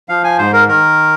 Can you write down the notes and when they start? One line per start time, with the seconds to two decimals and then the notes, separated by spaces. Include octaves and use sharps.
0.09 F3 F5
0.24 G#5
0.38 G#2 C5
0.53 A#4
0.68 D#3 A#4